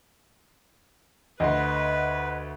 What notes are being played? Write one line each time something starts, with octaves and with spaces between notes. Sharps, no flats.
D2 B4 D#5 F#5 C6